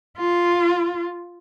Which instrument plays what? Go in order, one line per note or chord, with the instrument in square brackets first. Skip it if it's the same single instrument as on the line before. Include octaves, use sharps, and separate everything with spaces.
[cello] F4